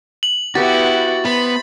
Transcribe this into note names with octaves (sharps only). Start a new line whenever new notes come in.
F#7
B3 E4 F#4 G4 B4 A6
B3 C5 B5